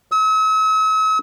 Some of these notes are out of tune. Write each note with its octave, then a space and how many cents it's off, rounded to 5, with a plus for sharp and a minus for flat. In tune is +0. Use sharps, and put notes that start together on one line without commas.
E6 -45